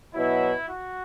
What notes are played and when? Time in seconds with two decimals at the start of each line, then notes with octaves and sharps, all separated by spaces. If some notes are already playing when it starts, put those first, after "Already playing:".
0.15 B2 F#3 E4
0.68 F#4